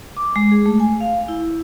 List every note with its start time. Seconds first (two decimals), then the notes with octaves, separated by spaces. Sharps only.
0.17 D6
0.36 G#3
0.51 G#4
0.66 A3
0.80 G#5
1.01 F5
1.28 E4